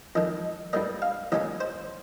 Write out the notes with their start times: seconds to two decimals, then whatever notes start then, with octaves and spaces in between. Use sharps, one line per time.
0.15 F2 D#3 G#3 D#5
0.73 G2 G3 A#3 D#5
1.02 F5
1.32 D#2 C#3 G#3 C#4 D#5
1.60 C5